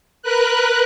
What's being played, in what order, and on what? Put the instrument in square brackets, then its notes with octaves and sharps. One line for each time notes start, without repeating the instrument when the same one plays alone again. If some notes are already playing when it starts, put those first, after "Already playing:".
[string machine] A#4 B4 F#6